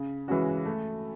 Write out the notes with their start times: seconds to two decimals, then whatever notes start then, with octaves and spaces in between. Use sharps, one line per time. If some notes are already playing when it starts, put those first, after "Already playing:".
Already playing: C#3
0.28 E3 G#3 C#4 F#4
0.65 A3